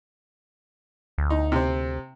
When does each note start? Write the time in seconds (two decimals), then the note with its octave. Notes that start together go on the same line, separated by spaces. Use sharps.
1.18 D2
1.30 D#4
1.52 C3 C4